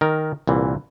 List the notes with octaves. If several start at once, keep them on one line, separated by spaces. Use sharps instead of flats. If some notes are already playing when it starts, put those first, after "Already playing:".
D#3 A#4
C2 A#2 E3